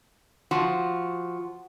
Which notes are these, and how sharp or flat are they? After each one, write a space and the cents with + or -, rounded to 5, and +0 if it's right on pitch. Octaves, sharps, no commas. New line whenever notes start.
F3 +0 F#4 +0